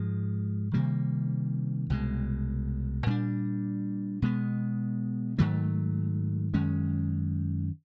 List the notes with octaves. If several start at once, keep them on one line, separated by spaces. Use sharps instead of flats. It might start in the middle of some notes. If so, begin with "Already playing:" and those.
Already playing: G#2 F3 G#3
C3 D#3 G3 A#3
C2 B2 G#3
A#2 G3 B3 D4
B2 G#3 B3
G#2 D#3 F#3 A3
F#2 D#3 G#3 C#4